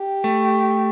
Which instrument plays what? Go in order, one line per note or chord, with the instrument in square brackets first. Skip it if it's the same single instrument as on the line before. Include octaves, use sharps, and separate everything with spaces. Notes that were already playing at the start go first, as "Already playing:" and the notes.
Already playing: [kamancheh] G4
[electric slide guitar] A3